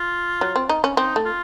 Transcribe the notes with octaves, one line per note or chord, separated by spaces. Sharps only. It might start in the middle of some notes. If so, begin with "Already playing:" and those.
Already playing: F4
F#3
C4
D#4
C#4
C4 D#4
A3
F4